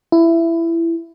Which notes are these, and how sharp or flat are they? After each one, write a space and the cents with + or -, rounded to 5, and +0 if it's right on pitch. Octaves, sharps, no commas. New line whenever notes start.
E4 +15